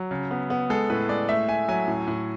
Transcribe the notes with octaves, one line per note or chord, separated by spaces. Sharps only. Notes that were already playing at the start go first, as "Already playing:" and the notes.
Already playing: F#3
C#3
B3
B3
G#3 A4
A2 B4
G#3 D5
A3 E5
A3 G#5
F#3 G#5
A2
A2